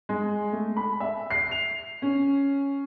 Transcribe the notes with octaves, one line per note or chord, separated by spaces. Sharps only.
G#3
A3
B5
E5
C7
F7
C#4